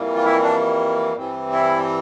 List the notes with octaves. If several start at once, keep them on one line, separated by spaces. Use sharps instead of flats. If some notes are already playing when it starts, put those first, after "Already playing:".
Already playing: F2 E3 G3 A#3
F4
E4
D4
G2 E3 G3 C4
E4